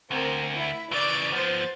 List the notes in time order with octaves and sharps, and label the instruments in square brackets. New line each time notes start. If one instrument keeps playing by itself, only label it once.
[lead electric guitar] D2 [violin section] C4 A#4
[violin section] E4
[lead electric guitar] C#3 E3 [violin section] D5 A6 D7
[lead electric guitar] F3 B3 [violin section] C5 A6